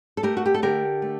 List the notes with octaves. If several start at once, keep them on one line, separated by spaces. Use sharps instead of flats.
A4
A3 G4 A#4
F#4
G4
A4
D3 G4 A#4
A3